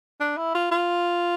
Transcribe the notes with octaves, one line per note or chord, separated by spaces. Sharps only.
D4
E4
F4
F4